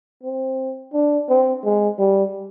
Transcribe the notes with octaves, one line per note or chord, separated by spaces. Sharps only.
C4
D4
C4
G#3
G3